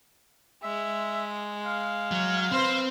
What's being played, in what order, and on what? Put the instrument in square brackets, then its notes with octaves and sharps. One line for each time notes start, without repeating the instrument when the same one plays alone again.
[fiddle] G#3 [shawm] E5
[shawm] F5
[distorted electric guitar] F#3
[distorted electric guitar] C4 [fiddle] B4 C5